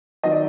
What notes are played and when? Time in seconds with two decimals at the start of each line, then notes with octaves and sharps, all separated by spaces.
0.23 D#3 F#3 D#5
0.31 D5